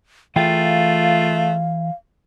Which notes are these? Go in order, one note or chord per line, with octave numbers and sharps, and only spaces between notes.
E3 A3 F4 G#4 F5 G5